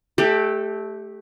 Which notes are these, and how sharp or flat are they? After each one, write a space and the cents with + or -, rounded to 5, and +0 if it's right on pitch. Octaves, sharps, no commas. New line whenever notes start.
A3 -15 G4 +10 D5 +30